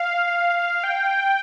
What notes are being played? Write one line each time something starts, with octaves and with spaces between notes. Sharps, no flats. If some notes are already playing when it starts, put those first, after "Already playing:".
Already playing: F5
G5